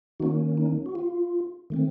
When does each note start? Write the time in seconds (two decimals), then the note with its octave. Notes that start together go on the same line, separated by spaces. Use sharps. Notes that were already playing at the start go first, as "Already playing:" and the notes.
0.20 D#3 A#3 C#4 D#4 F#4
0.57 D#4
0.86 F#4
0.95 F4
1.70 D#3 A3 C4